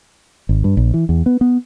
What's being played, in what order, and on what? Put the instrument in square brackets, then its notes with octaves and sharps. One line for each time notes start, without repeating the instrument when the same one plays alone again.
[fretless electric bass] G#1
G2
A#1
E3
E2
B3
B3